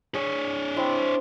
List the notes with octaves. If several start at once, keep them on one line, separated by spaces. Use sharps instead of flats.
D4 G#4 C#5
C4 E4 C5